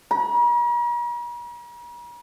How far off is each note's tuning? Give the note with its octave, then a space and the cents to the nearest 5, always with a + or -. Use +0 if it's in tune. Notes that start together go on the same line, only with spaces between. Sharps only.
A#5 +45